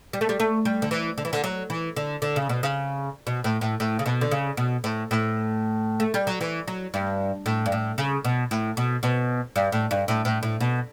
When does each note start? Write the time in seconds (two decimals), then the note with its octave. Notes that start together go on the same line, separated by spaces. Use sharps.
0.13 G3
0.21 A3
0.29 G3
0.40 A3
0.65 G3
0.82 D3
0.91 E3
1.18 D3
1.25 E3
1.33 D3
1.44 F#3
1.70 E3
1.96 D3
2.22 D3
2.36 C#3
2.49 B2
2.63 C#3
3.27 B2
3.44 A2
3.61 A2
3.80 A2
3.99 C#3
4.06 B2
4.21 D3
4.31 C#3
4.57 B2
4.84 A2
5.11 A2
6.00 A3
6.14 G3
6.27 F#3
6.41 E3
6.68 F#3
6.94 G2
7.46 A2
7.66 G2
7.72 A2
7.98 C#3
8.25 B2
8.51 A2
8.77 B2
9.03 B2
9.56 G2
9.72 A2
9.91 G2
10.08 A2
10.25 A2
10.43 A2
10.60 B2